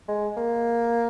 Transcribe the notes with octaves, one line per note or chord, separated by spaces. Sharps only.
G#3
A#3